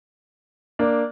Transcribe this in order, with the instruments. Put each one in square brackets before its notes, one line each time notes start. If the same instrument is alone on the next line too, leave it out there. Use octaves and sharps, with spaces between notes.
[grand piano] A#3 D4